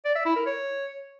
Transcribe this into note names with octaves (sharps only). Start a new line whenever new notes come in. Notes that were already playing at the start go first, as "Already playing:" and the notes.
D5
E5
E4
A#4
C#5